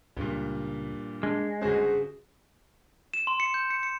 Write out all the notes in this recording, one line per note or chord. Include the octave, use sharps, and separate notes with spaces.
C#2 G2 A#2
G#3 D4
G1 C#3 F#4 G#4 C5
E7
C6
C#7
G6
C#7
C#7